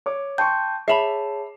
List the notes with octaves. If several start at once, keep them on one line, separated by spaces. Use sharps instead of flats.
C#5 D6
G5 A5 C6 C#6 G6
G#4 C#5 E5 A5 B5 C7 E7 F7